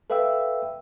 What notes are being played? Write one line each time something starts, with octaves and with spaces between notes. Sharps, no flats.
A4 B4 E5 F5 G5 E6